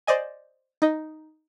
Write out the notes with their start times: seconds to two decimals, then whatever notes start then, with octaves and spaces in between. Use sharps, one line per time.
0.07 C5 D5 D#5 G#5
0.82 D#4 D#5